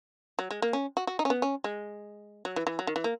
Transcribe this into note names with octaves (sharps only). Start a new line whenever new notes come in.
F#3
G#3
A#3
C#4
F#4
F#4
D#4
C#4
B3
C#4
G#3
F#3
E3
E3
F#3
D#3
E3
A#3